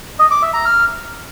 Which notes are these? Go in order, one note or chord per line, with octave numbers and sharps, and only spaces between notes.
D#5
D6
E5
A#5
F6